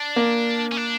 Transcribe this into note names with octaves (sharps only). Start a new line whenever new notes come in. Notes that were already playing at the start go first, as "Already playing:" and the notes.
Already playing: D4
A#3
C#4
D4